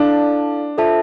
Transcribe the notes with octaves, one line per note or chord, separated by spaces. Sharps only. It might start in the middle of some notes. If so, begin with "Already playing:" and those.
Already playing: D4 E4 A4 D5 F5 A5
F4 A4 C5 E5 A5